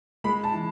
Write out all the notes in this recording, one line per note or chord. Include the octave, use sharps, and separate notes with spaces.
G#3 B5
A5
E3